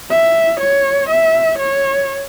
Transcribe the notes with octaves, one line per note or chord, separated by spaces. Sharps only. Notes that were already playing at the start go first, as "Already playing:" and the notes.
E5
C#5
E5
C#5